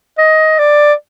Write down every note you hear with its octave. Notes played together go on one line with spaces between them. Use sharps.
D#5
D5